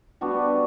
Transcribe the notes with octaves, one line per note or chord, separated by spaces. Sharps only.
G3 B3 D4 F#4